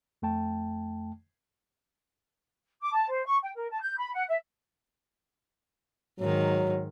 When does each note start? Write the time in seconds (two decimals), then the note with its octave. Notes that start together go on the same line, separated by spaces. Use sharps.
0.22 F2 A3 G5 A5
2.81 D6
2.92 A5
3.10 C5
3.25 C#6
3.43 G5
3.55 A#4
3.70 A5
3.81 G6
3.97 B5
4.14 F#5
4.28 E5
6.20 G#2 D#3 F#3